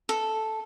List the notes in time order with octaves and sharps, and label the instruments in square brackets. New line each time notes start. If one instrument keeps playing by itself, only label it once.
[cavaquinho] A4